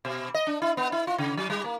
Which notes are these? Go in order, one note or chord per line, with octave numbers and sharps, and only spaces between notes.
B2
D#5
D4
E4
B3
E4
F4
C#3
F#3
G3
A#3